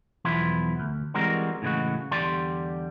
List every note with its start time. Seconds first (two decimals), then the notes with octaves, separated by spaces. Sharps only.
0.25 B1 E2 F3 B3 E4 C6
0.80 D2
1.14 E3 G3 G#3 C4 F#4 A#4
1.62 A2 C#3 E3 G#3 F#4
2.11 E2 D3 G3 G4 D5 C6